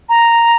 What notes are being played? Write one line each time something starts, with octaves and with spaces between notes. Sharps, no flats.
A#5